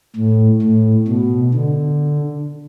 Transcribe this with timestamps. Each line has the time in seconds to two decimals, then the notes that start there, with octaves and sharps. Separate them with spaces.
0.16 A2
0.63 A2
1.08 B2
1.54 D3